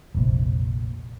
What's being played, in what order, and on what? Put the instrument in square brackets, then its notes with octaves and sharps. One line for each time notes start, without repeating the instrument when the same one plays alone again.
[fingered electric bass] F1 A#1